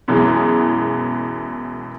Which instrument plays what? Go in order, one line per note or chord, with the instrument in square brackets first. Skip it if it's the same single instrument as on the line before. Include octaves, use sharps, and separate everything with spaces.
[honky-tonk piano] F#2 B2 E3 G#3